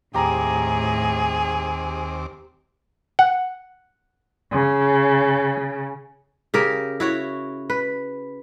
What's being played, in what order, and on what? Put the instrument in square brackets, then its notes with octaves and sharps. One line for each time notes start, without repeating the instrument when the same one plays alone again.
[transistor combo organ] D#2 C4 D6 [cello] A2 [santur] G4 A#5 [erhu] G#4
[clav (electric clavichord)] F#5
[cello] C#3
[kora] C#3 G4 A#4
E4 F#4 C#5
B4